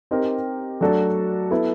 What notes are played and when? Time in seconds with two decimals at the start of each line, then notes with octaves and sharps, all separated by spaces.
0.11 C4 D#4 G4 A#4
0.81 F#3 A3 D4 F#4 A4
1.50 B3 E4 A4